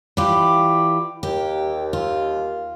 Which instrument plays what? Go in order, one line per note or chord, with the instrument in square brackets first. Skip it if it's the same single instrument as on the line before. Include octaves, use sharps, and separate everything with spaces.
[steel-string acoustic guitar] E3 F4 G4 [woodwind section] D5 B5 D6
[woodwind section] D#2 [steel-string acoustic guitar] G4
[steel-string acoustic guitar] F4